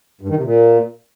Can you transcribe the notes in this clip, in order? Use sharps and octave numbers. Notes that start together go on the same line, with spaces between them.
G2
D#3
C3
A#2